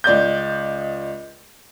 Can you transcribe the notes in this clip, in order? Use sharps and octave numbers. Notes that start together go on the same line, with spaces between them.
C#2 D5 D#5 G6